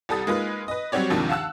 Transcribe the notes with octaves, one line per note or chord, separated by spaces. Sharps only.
C2 G3 A4 D#6 A6
G#3 A#3 D#4 F4 B4
B4 D#5
F#3 G3 C4 F#4 C#5 D5
D#2 G#2 C3 D#3 F3 D4
F5 F#5 A5 E6 F#6